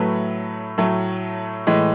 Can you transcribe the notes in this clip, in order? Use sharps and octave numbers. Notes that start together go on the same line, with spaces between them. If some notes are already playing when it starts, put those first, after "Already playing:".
Already playing: A2 F#3 A3 B4
A2 F#3 A3
A2 E3 G#3